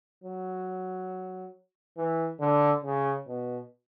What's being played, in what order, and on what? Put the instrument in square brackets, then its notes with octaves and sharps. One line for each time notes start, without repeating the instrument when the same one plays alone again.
[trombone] F#3
E3
D3
C#3
B2